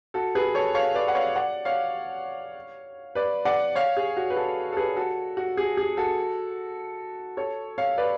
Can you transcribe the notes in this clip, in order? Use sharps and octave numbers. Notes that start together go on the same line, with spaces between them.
F#4 A4
G#4 B4
A4 C#5
C#5 F5
B4 D5
F#5
C#5 F5
D5 F#5
C#5 F5
B4 D5
D5 F#5
C#5 F5
G#4
F#4
B4
F#4 A4
A4
G#4 B4
F#4 A4
F#4
G#4
G#4
F#4 A4
A4 C#5
C#5 F5
B4 D5